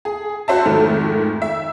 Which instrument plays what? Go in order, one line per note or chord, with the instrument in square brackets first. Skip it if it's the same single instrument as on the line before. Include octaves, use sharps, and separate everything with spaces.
[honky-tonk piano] G#4
F#4 C5 E5 A5
F2 G#2 D#3 A3
E5